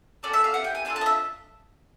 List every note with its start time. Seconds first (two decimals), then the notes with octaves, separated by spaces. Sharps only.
0.23 A3 C#4 F#4 A4 D5
0.33 E5
0.44 F5
0.54 B3 E4 G4 F#5
0.64 G5
0.75 G#5
0.85 D4 F4 A4 G#5
0.96 A5
1.01 D#5
1.06 E5